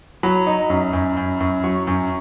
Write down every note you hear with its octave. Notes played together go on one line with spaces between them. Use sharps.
F#3 B5
D#4
F#2
F#2
F#2
F#2
F#3 C#6
F#2